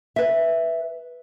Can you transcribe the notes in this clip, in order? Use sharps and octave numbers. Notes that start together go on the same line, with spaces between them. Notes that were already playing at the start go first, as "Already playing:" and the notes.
B4 E5